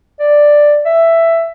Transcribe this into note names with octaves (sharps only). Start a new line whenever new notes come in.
D5
E5